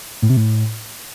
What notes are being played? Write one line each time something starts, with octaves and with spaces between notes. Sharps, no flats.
A2
C3
A2